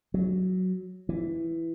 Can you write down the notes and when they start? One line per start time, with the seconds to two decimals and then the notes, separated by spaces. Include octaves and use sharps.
0.14 F#3
1.09 E3